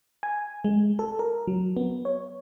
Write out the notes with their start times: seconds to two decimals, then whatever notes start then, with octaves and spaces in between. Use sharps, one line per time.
0.23 G#5
0.64 G#3
0.99 A4
1.19 A#4
1.47 F#3
1.77 B3
2.05 C#5